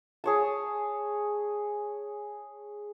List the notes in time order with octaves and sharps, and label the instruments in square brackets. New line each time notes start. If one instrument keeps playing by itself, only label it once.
[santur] G#4 C#5 A5